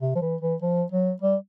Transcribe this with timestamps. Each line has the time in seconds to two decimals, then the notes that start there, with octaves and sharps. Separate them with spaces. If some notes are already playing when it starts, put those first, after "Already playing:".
0.01 C3
0.15 F3
0.22 E3
0.41 E3
0.62 F3
0.92 F#3
1.22 G3